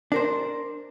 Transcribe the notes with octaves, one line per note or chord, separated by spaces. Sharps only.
D4 A#4 C5